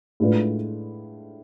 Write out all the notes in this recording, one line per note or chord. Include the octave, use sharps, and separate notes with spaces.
A2 G#3 D4 F4 B4